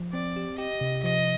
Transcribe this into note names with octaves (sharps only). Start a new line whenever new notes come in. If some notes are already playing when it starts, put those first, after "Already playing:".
Already playing: F3
C4 D5
G4
G4 D#5
C3
F3 D#5